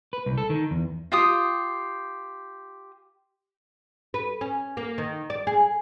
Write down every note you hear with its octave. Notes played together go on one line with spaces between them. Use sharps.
B4
C2
A4
D#3
E2
F4 G4 D#6
B4
C#4
A#3
D#3
D5
G#4